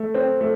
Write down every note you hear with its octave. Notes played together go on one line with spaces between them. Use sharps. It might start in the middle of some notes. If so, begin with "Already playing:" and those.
Already playing: A3
C4
A3